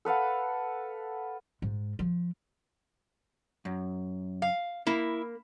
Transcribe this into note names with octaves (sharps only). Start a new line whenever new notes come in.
A4 B4 F5 F#5
G#2
F3
F#2
F5
A#3 E4